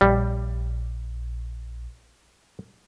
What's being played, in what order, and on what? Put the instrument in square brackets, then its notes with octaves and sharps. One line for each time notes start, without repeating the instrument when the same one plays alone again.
[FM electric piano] A#1 [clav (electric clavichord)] G3